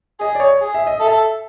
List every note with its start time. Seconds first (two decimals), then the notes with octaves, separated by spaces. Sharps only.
0.20 G#4 D#5
0.35 D5
0.40 C#5
0.61 G#4
0.75 E5
0.87 D#5
1.00 A4 E5